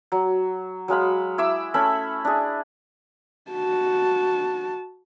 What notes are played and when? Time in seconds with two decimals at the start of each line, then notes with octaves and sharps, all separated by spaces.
0.12 F#3
0.88 F#3 G#3 F5 B5
1.38 E4 D6 E6
1.74 A3 C#4 E5 B5
2.25 D4 G#4
3.51 F#4 A5